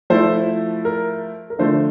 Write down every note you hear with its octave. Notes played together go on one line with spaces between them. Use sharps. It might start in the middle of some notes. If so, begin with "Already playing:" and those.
F3 A3 E4 C5
A#4
A#4
D3 F3 A3 C5